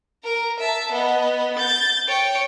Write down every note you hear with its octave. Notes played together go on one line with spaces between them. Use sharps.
A#4 A#5
E5 A5
B3 D#5
G6 A6
C#5 G5